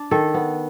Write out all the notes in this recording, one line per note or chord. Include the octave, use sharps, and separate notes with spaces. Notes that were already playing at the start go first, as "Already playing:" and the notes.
Already playing: D4
D#3 A4
B3